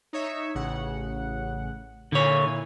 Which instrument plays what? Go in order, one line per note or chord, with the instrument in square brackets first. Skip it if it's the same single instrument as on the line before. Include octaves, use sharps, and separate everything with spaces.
[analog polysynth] D#4 C#5 E5
A1 C#3 F#5
[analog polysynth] A#2 E4 G#5 [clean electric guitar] D3 C#5